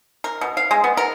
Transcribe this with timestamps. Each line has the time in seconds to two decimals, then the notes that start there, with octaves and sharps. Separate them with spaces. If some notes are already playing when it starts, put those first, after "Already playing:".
0.24 A#4
0.41 B2
0.57 F5
0.71 G#3
0.84 B3
0.97 A#4